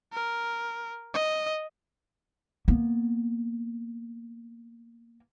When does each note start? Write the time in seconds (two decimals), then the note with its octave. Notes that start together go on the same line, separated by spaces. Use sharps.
0.13 A#4
1.14 D#5
2.68 A#3 B3